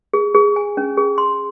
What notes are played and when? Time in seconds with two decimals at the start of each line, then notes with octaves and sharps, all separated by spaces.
0.13 G#4
0.35 G#4
0.56 G#5
0.77 C#4
0.97 G#4
1.18 C6